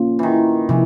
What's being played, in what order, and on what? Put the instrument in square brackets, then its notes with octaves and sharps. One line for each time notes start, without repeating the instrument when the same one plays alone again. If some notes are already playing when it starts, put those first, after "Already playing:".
Already playing: [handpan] A#3 C#4 F4
[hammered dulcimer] D#3 E3
[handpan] C3 F3 [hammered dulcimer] E3